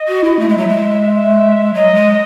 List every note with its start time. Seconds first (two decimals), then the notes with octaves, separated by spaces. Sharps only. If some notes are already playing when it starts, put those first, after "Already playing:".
Already playing: D#5
0.08 F#4
0.24 E4
0.39 A3
0.49 G#3
0.54 F#3 E5
0.68 G#3
1.14 E5
1.74 F#3 D#5
1.95 G#3